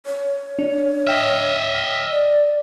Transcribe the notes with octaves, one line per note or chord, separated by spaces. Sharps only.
C#5
D4
D#5 E5 G5 F6
D5